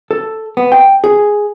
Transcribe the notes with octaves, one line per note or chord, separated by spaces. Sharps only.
A4
B3
G5
G#4